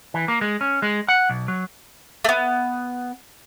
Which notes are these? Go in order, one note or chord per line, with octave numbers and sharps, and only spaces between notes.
E3
A#3
G#3
C#4
G#3
F#5
B1
F#3
A3 B3